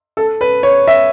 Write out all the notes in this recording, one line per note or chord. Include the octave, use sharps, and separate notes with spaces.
A4
B4
C#5
E5